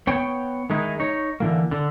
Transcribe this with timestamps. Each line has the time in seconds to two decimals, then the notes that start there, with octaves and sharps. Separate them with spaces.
0.07 B3 C#5 G5
0.70 D#3 G#3 D#4 E4
1.00 D#4 C#5
1.40 D3 E3 A#3
1.71 D3